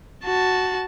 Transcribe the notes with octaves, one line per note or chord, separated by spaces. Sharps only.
F#4 A5